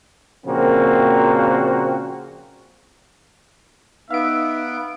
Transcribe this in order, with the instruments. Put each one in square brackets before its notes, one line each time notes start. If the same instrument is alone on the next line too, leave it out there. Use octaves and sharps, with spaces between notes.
[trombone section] A#2 C#3 F3 A#3 C4 F#4
[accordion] B3 [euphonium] D#4 [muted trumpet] E5 [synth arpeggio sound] F5 D7